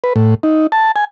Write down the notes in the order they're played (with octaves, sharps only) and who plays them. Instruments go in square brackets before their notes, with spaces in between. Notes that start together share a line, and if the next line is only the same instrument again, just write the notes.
[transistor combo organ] B4
A2
D#4
A5
G#5